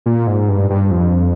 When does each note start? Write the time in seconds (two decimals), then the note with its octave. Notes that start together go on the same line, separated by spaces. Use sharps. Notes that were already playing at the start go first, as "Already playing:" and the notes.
0.06 A#2
0.27 G#2
0.48 G2
0.70 G2
0.91 F2